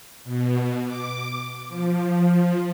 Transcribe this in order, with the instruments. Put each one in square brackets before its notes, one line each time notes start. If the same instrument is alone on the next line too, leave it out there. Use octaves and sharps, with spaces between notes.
[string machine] B2
D6
F3